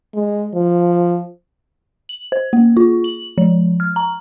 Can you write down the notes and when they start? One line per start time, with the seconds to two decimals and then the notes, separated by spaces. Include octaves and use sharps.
0.15 G#3
0.54 F3
2.09 F#7
2.32 C5
2.53 A#3
2.77 F4
3.04 F#7
3.38 F3
3.80 F6
3.96 A#5